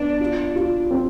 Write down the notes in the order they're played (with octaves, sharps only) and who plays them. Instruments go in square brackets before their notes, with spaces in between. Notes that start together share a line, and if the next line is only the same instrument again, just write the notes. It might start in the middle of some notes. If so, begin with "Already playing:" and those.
Already playing: [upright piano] B3 [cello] D4
[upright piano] F4
F4
C4